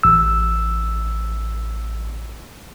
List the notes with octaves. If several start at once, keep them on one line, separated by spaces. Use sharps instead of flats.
A1 E6